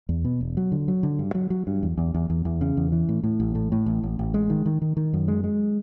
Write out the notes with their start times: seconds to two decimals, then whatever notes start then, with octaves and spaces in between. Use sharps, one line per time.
0.09 E2
0.25 B2
0.41 E1
0.57 F#3
0.72 D3
0.88 F#3
1.03 D3
1.19 G2
1.35 F#3
1.50 F#3
1.67 G2
1.83 E2
1.98 E2
2.14 E2
2.30 E2
2.45 E2
2.61 C#3
2.77 E2
2.92 E3
3.09 A2
3.23 A2
3.40 A1
3.55 A2
3.72 A2
3.86 A1
4.03 A1
4.19 A1
4.34 G#3
4.50 D#3
4.66 D#3
4.82 D#3
4.97 D#3
5.13 F#2
5.28 G#3
5.44 G#3